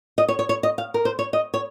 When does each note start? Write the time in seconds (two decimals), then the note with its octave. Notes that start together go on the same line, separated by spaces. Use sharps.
0.18 D#5
0.28 C#5
0.39 C#5
0.49 C#5
0.63 D#5
0.78 F5
0.94 A#4
1.05 C5
1.19 C#5
1.33 D#5
1.54 C#5